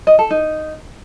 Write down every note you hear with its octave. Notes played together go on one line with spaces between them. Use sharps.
D#5
A4
D#4